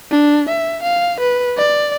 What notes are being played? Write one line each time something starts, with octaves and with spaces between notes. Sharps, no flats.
D4
E5
F5
B4
D5